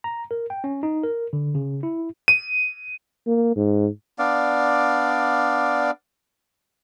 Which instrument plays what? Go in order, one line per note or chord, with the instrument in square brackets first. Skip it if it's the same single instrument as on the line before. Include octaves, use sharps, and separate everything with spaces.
[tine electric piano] A#5
A#4
G5
C#4
D#4
A#4
D3
C#3
E4
[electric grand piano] D#7
[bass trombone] A#3
G#2
[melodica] B3 D4 D5 F5